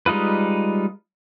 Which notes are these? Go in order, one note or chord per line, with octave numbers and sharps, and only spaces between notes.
G3 G#3 D#4 F4 B4